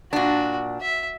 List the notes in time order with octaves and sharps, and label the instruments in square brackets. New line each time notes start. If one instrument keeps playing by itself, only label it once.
[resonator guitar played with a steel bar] A#2 D4 [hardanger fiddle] F#4
[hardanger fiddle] E5